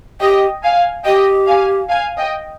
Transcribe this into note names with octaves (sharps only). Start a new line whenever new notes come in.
G4 D#5 G5
F5 G#5
G4 D#5 G5
F5 G#5
F5 G#5
D#5 G5